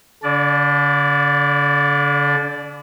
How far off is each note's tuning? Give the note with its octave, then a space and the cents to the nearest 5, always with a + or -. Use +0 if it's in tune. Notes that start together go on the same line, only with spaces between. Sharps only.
D3 -40 D4 -40 D5 +0